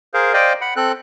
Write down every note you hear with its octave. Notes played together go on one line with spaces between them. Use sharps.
G#4 A#4 C5 F5
C5 D5 D#5 F5 G5
F#5 B5
C4 A4 F#6